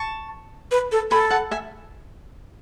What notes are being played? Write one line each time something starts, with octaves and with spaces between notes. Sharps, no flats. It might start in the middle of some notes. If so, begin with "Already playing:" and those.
Already playing: A5 C#6
B4
A4
A4 G#5 B5
F#5 A5
E5 G#5